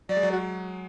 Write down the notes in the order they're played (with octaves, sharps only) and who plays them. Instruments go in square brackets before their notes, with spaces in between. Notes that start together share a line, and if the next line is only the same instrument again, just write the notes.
[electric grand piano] F#3 [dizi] D5
[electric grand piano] G#3
F#3
[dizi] F#4